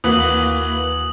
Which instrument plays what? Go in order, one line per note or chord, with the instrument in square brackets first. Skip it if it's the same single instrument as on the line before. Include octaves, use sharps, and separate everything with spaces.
[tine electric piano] D#2 [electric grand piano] E3 B4 [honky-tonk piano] A#3 F#4 [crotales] D#6 F#7